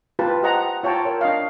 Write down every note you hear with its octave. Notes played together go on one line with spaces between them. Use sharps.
F4 G4 B4 A5
G4 C5 D#5 F#5 A#5
F4 C#5 G5 A5 A#5
A#4 C#5
D4 D#5 F5